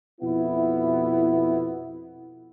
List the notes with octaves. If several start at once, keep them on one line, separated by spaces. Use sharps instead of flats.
F2 B2 B3 E4